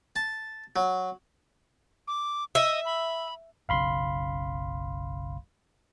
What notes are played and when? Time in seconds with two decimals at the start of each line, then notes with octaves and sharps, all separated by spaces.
0.16 A5
0.76 F#3
2.08 D6
2.55 D#5 E5
2.85 B5
3.69 F#1 B1 C#3 F5 B5 C6